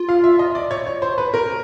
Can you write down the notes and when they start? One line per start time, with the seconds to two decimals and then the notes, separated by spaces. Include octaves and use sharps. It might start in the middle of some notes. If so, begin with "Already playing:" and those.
Already playing: F4
0.09 F5
0.24 E5
0.39 D#5
0.55 D5
0.71 C#5
0.87 C#5
1.02 C5
1.18 B4
1.34 A#4